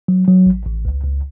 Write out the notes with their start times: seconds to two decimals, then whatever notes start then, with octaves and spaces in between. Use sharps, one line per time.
0.08 F#3
0.28 F#3
0.46 A1
0.66 A1
0.85 C#2
1.04 C#2